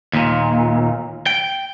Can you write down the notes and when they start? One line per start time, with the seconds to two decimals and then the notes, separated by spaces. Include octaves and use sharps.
0.13 D#2 A#2
1.27 G5